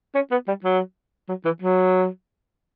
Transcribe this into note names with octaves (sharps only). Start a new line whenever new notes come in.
C#4
B3
G3
F#3
F#3
E3
F#3